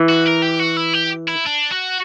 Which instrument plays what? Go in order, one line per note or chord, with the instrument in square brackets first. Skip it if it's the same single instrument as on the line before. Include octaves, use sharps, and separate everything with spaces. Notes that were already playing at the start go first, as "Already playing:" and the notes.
Already playing: [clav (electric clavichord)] E3
[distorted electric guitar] F#4
A#4
G4
F#4
E4
G4
E4
D4
F#4